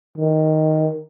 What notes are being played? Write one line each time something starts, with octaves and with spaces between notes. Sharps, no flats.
D#3